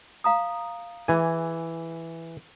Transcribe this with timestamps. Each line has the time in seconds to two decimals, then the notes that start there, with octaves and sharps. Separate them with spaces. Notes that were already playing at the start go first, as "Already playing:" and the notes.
0.24 F5 A#5 D#6
1.08 E3 G#4 G#5